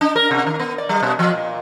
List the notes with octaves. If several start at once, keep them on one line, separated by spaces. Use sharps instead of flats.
D4
A#4
C3
D#3
B3
D5
G3
B2
F3
A#2